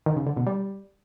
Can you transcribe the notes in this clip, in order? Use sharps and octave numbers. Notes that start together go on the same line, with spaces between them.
D#3
C#3
D3
B2
G3